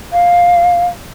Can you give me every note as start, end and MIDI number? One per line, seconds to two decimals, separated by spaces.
0.13 0.86 77